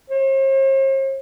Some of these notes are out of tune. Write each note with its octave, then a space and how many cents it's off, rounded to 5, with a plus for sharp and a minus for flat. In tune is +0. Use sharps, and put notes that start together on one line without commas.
C5 +45